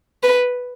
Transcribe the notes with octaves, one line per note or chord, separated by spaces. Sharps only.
B4